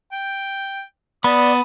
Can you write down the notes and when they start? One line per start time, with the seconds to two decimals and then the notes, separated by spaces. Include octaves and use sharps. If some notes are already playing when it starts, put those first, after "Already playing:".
0.12 G5
1.24 B3 D5 A5 B5 D#6